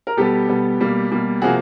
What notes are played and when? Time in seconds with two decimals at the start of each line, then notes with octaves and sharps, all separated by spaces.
0.07 A#4
0.17 B2 G3 B3 G4 A4
0.49 B2 G3 B3
0.80 B2 G3 A#3
1.11 B2 G3 A#3
1.42 C3 F3 A#3 F#4 G#4